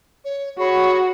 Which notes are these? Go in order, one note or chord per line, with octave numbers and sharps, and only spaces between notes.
C#5
F#4 G#4 C#5 B5 C#6